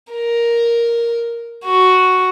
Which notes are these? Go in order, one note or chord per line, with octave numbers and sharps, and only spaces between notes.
A#4
F#4